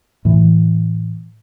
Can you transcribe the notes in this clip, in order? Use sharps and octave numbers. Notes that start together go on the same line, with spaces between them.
A2 E3